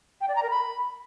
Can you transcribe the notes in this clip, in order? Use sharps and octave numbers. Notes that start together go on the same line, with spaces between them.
G5
D5
A#5
A#4
B5